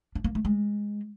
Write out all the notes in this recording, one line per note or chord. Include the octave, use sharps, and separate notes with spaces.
D4
A#3
A3
G#3